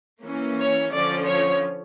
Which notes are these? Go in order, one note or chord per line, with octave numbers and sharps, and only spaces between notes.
E3 A#3 C#4
C#5
D3 F3 C#4 D5
C#5